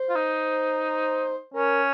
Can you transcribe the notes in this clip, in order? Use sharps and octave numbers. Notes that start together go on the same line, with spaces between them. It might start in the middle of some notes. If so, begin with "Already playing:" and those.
Already playing: C5
F4
D#4
C#4 A#4